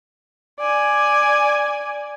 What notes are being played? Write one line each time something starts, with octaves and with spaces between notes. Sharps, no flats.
D5 G#5